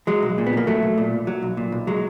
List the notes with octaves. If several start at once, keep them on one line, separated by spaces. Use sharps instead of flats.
F#3 G#3
B1
A#2
B3
B1 A#3
F#3 A3
B1
A#2
B1
F#3
B1
A#2
B1
F#3 G#3